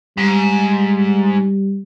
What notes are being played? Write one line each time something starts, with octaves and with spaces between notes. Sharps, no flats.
G#2 G3